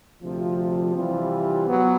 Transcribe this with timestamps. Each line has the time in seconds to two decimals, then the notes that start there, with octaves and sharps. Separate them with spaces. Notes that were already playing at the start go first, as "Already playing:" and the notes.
0.21 D2 C3 F3
0.93 C3 E3 G3 C4 F4
1.67 F#3 B3